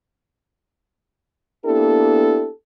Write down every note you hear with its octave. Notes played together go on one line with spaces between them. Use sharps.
A#3 B3 D4 E4 G4 A4